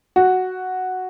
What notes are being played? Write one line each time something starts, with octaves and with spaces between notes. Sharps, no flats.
F#4